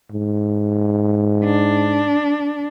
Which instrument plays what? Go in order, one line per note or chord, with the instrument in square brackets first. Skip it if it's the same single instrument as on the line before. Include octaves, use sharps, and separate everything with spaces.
[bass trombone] G#2
[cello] D4